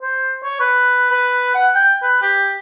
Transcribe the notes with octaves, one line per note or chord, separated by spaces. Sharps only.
C5
C#5
B4
B4
F#5
G5
B4
G4